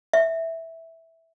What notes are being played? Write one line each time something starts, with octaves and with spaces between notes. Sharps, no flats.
E5